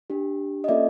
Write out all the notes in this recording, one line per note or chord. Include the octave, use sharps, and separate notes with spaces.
D4 G4
D#5
A#3 C#4 F4 A4 D5 E5